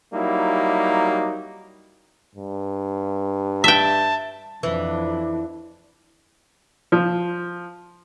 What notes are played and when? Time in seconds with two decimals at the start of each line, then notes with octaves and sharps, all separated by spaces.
0.13 F#3 G3 A#3 D#4 E4
2.35 G2
3.64 E5 G5 A5
4.63 F2 E3 D4
6.92 F3